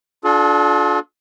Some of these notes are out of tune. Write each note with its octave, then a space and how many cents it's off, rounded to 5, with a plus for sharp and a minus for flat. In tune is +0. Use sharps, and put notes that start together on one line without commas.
D4 -5 F4 +30 A4 -45